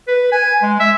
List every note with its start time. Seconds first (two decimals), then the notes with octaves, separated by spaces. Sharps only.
0.08 B4
0.32 G#5
0.63 G#3
0.80 E5